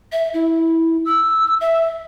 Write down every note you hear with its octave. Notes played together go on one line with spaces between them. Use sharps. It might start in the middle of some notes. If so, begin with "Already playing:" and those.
E5
E4
E6
E5